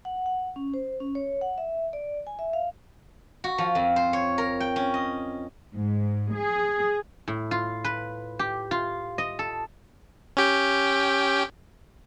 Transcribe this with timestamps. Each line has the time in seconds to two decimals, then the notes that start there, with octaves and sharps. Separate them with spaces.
0.05 F#5
0.26 F#5
0.56 C#4
0.74 C5
1.00 C#4
1.15 C#5
1.41 F#5
1.58 E5
1.93 D5
2.27 G#5
2.39 E5
2.53 F5
3.44 F#4
3.58 F3
3.75 F2
3.96 C5
4.13 C#5
4.38 A#4
4.60 G5
4.76 C#4
4.94 D#5
5.74 G#2
6.34 G#4
7.28 A2
7.51 F4
7.84 B4
8.39 G4
8.71 F4
9.18 D#5
9.39 A4
10.37 C#4 G4 G5